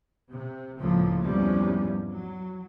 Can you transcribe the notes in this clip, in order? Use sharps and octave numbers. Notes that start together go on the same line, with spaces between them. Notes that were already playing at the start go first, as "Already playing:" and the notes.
C3
C#2 A2 C#3 F3 A3 A#3
E2 G#2 C3 F3 G3 C#4
F#3